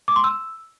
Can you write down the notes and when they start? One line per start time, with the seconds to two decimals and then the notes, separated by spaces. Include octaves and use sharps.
0.08 D6
0.16 C6
0.24 E6